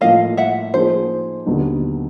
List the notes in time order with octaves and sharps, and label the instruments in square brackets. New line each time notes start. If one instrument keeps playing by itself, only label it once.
[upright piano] A2 F3 A#3 [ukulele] D#5 F5
[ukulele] E5 F#5
[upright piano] F3 A#3 D#4 G#4 [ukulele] C5
[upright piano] D#2 D3 F#3 B3 D#4